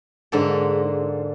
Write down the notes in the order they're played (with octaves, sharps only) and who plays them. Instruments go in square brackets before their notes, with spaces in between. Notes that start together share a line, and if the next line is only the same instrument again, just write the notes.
[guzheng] G#2 D3 A#3 A4